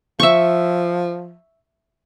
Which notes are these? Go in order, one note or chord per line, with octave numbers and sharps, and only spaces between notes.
F3 E5 C#6